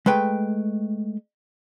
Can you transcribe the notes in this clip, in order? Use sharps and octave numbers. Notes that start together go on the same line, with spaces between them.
G#3 A3 B4 G5